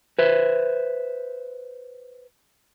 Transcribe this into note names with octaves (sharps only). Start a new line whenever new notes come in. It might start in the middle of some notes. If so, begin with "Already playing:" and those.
B4 C5 E5